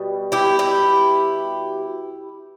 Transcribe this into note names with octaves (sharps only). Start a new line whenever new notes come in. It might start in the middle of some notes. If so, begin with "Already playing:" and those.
Already playing: B2 G3
E4 G4
E4 G4